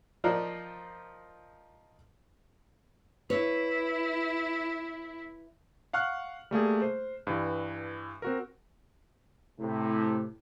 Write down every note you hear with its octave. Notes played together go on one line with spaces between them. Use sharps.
F3 D#4 F4 A#4 C5 D5
E4 B4 C#5
F5 F#5 C#6 F6 F#6
G3 A3 A#3 G#4
C5
G2 E3
C4 F#4 A#4
A2 C3